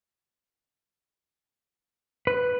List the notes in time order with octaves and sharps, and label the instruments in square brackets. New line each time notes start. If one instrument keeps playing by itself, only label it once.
[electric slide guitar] B4